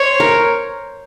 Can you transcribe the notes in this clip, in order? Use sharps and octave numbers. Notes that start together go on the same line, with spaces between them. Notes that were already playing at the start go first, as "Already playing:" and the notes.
Already playing: C5 C#5
A#4